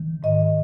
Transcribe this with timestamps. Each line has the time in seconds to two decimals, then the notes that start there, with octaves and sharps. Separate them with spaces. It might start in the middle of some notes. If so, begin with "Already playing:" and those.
Already playing: D#3
0.23 G#2 D#5